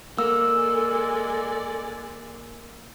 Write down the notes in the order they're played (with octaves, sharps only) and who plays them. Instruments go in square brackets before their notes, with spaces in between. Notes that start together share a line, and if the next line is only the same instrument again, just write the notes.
[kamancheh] G#3 D5 [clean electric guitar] A#3 [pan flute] A4 [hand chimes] E6